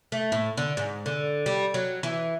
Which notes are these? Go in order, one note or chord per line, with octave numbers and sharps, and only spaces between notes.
A3
A2
D3
G#2
D3
G3
F#3
E3